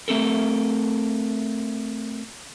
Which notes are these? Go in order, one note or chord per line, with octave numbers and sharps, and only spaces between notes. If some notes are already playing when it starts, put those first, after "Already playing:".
A3 C4 A4 A#4